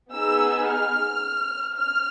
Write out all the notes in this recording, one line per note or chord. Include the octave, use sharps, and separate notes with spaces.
B3 D#4 G#4 E6
F6
F6